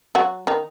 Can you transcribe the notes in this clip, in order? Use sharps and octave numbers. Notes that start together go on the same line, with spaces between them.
F#3 F#4
D#3 D#4